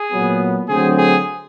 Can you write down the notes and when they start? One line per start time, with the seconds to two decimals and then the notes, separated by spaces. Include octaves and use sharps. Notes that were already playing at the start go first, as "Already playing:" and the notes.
Already playing: G#4
0.12 A#2 F#3 B3
0.69 D3 F#3 A3 C4 G#4
0.98 G#4